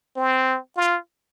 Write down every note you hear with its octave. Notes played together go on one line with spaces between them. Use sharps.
C4
F4